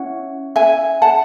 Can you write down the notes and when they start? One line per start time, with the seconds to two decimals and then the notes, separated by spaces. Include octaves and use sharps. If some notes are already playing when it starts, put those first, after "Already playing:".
Already playing: C#4 E4 F#5
0.56 E5 G#5
1.02 F#5 A5